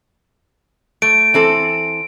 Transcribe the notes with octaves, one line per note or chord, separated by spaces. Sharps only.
A3 D7
E3 C4 A4